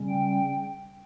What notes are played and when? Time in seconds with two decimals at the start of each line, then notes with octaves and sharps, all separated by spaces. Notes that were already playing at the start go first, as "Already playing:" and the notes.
Already playing: C#3 G3 C#4
0.09 G5